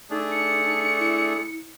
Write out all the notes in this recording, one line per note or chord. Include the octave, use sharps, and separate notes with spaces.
A3 D4 D#4 G#4
C#7
E4